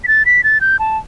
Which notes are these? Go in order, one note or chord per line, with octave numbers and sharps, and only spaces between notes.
B6
A6
B6
A6
G6
A5